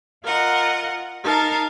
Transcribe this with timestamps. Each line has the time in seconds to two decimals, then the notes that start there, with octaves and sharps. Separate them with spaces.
0.23 F4 A#4 D#5 F#5
1.23 D#4 A#4 F5 A5